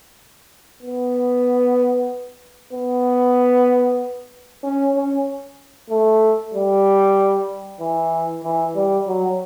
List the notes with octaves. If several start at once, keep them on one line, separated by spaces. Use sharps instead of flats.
B3
B3
C#4
C#4
A3
G3
E3
E3
G3
F#3